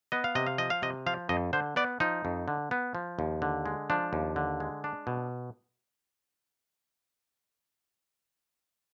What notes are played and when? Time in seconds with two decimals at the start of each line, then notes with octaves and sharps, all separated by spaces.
0.12 B3 D#5
0.24 F5
0.35 C3 D#5
0.47 F5
0.58 F3 D#5
0.70 F5
0.82 C3 D#5
1.06 F3 F5
1.29 F2 D#5
1.53 D3 C5
1.76 B3 D5
2.00 F3 D#4
2.25 F2
2.48 D3
2.71 B3
2.95 F3
3.19 D#2
3.42 D3
3.66 G#3
3.90 F3 D4
4.13 D#2
4.36 D3
4.60 G#3
4.84 D4
5.07 B2